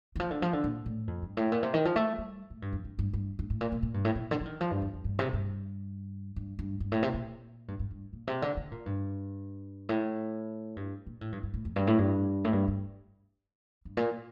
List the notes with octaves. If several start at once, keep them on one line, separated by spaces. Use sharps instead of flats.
D#3
F3
D3
F3
D3
A#2
A2
F2
G2
A2
A#2
C3
D#3
F3
A3
G3
A2
G2
F2
G2
G2
G2
G2
A2
A#2
A#2
A#2
G2
A2
A#2
D3
F3
D#3
F3
G2
F2
F2
G2
C3
G2
G2
G2
G2
A2
C3
A#2
G2
G2
G2
A#2
C3
D3
D3
A#2
G2
A2
G2
A#2
A2
G2
G2
A2
F2
G2
A2
G2
A2
G2
G2
G2
A#2